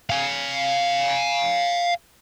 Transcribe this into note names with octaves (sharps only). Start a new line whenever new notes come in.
F5 G#5